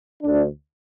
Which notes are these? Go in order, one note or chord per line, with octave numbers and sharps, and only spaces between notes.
D2 D3 D4